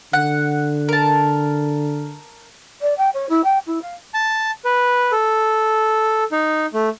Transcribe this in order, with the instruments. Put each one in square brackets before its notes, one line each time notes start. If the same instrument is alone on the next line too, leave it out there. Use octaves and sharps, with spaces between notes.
[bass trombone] D3 [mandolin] F#5
[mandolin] A#4 A5
[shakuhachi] D5
G5
C#5
E4
G5
E4
F5
[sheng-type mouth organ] A5
B4
A4
D#4
A3